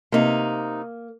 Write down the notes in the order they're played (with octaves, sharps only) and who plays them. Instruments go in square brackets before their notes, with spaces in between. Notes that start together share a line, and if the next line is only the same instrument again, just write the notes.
[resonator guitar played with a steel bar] C3 D#4 [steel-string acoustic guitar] A#3